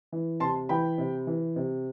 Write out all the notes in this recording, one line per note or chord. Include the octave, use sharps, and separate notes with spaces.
E3
C3 A5 C6
E3 G5 B5
C3
E3
C3